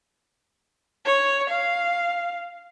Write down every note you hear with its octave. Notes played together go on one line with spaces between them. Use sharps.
C#5
F5